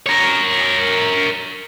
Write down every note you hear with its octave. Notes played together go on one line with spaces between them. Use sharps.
A#4 C#5